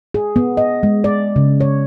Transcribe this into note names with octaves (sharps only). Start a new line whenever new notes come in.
G#4
B3
D#5
G#3
D5
C#3
C#5